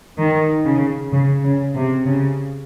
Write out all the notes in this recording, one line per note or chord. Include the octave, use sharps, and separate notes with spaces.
D#3
C#3
C#3
C#3
C3
C#3